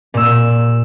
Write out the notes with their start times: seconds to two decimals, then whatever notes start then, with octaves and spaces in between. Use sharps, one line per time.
0.14 A#2 E6